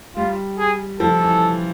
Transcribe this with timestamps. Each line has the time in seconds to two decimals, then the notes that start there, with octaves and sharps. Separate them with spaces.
0.16 G3 F4
0.58 G#4
1.00 F3 A4
1.21 E3